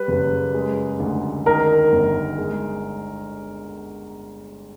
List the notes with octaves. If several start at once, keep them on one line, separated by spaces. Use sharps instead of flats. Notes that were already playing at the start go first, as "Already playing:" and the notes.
Already playing: G3 B4
F#1
G#3
D2
D#3 A#4
G1
G#3